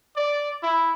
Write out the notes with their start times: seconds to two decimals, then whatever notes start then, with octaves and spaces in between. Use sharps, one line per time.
0.16 D5
0.63 E4